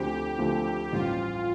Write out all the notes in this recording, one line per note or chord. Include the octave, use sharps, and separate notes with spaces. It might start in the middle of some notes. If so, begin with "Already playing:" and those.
Already playing: D2 D3 F3 A3 C4 G4
D2 D3 F3 A3 C4
A1 G2 F3 F4